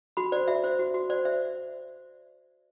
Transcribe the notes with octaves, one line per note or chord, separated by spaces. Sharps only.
F#4 B5
C5 D5
F#4 E5
C5
F#4
F#4
C5 D5
C5 E5